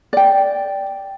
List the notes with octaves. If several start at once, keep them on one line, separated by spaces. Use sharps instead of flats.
D5 G5